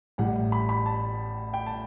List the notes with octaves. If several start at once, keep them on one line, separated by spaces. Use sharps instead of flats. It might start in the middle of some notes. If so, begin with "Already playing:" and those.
A1 A2 G3 F#5
B5
B5
A5
G5
A5